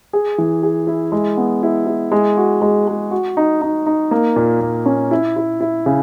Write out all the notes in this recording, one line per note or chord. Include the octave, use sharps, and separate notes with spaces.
G#4
E3
G#4
E4
G#3
B3
E4
E4
G#3
F#4
G#3
G#3
F#4
D#4
D#4
D#4
A#3
A#2
A#2
C#4
E4
E4
E4
C#3